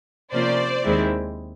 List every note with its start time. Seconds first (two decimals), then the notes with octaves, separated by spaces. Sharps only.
0.33 C3 F3 A#3 C#4 F4 C5 D5
0.83 D#2 D#3 G#3 C4 E4